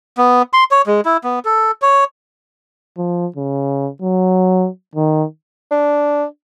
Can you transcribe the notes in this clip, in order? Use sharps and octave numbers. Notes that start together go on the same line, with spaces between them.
B3
C6
C#5
G#3
E4
B3
A4
C#5
F3
C#3
F#3
D#3
D4